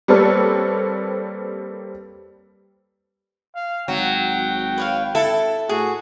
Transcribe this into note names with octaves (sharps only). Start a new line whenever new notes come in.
G3 A#3 C4 A4 B4 C#5
F5
G#1 F#3 G5
B4 C#5 F5
E4 A4
A2 F#4 G#4